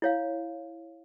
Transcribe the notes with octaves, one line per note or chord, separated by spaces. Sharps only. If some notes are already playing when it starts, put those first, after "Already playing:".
E4 C#5 F5